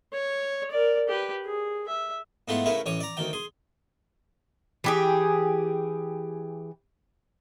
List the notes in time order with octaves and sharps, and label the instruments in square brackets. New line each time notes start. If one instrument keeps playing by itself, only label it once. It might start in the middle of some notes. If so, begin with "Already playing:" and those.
[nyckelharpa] C#5
A#4 D5
G4 B4
G#4
E5
[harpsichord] G#2 A3 B3 E4 F4 F#5
C#3 A3 E4 A#4 B4
A1 C#5 G#5 D6
D5 A#5
D2 D#3 G5
G#4 C6
[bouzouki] E3 G4 G#4